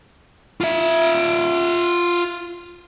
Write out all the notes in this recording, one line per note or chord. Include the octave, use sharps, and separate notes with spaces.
F4 E5